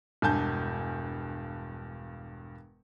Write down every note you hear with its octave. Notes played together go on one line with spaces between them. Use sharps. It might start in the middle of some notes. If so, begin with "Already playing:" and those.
E1 G2 G#5 A5 G6